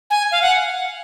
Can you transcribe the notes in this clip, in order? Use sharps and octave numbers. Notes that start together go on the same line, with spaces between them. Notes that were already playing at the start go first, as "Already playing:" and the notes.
G#5
F5
F#5